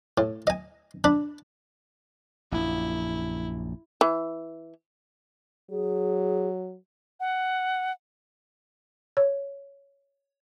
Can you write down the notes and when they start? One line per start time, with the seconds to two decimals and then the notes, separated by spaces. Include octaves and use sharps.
0.18 A2
0.47 D#5 G#5
1.04 D4 B5
2.52 A#1 F#2 E4
4.01 E3
5.71 F#3 G#4
7.20 F#5
9.17 C#5